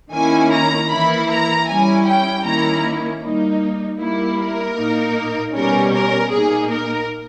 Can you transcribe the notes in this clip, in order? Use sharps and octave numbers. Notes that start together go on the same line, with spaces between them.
D#3 A#3 C#4 E4 G#5
A#5
E3 A#3 E4 B5
A#5
G3 C#4 E4 G#5
G5
D#3 A#3 C#4 E4 A#5
G3 A#3 D#4
G3 A#3 E4
A#4
A#2 A#3 D#4
B2 G3 C#4 A#4
A#4
A#2 A#3 D#4 G#4
A#4